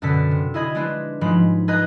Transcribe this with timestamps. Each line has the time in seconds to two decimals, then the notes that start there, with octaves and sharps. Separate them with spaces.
0.02 F#2 B2 D3 A4 B6
0.31 C3
0.54 E4 G#4 D#5 B5 G#6
0.75 G#3 D4 E4 B4 C5
1.21 G#2 F3 F#3 G#3 B5
1.68 G#4 B4 D#5 A#5 F#6 G6